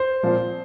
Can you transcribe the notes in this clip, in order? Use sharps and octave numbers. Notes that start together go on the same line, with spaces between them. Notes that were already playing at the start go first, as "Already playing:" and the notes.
Already playing: C5
A#2 F3 C4